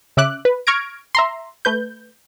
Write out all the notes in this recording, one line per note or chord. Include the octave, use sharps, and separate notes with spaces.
C#3 E5 D6 F#6
B4
C#6 F6 G#6 A#6 D7
E5 A#5 C6
A3 B4 G6